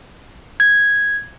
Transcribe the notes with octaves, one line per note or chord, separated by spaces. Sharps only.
G#6